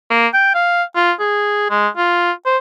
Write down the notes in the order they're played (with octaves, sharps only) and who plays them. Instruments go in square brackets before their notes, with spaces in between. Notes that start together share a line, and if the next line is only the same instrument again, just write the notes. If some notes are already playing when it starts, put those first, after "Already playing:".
[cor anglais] A#3
G5
F5
F4
G#4
G#3
F4
C5